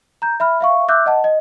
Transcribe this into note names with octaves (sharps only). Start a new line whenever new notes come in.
A#5 G6
E5 B5 F6
E5 F5 C#6
E5 D6 E6 F#6 G6
D#5 F#5 A5
D#5